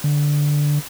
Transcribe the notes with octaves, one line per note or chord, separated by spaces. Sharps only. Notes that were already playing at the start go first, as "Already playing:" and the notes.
D3